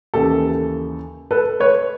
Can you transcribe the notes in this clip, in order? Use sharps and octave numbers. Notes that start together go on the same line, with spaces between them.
D#2 C#3 E3 G4 A4
A4 B4
B4 C#5